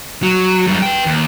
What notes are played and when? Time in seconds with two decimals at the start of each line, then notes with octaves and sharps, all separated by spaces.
0.23 F#3
0.67 F#2 G3
0.82 B4 G5
1.06 D#2